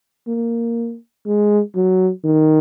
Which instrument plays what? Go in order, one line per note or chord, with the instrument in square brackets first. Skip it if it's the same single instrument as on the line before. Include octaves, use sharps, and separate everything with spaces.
[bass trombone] A#3
G#3
F#3
D#3